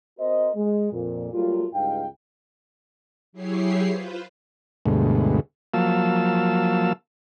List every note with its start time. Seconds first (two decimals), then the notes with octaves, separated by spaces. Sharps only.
0.19 C4 F#4 A#4 C5 D#5
0.55 G#3
0.92 F2 A#2
1.33 F#3 G3 A3 A#3 F4
1.73 C#2 G2 G#3 D#4 F5 G5
3.33 F#3 E4 G4 G#4 C#5 C7
3.87 F4 B4 C5
4.86 D2 G2 B2 G#3 A3
5.74 F3 F#3 A#3 F5 A5 E6